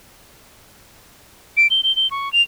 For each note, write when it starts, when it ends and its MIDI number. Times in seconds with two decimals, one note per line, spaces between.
1.57 1.67 98
1.71 1.81 103
1.84 1.95 103
1.96 2.10 103
2.11 2.32 85
2.33 2.42 101